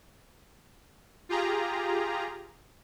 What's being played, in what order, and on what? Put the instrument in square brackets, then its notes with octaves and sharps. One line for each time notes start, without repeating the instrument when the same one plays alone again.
[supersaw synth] F4 G4 G#4 A#5